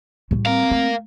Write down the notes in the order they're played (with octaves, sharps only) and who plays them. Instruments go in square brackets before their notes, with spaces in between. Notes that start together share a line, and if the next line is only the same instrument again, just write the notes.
[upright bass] A2 G3
[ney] C4 [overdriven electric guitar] A#4 F5
[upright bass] A3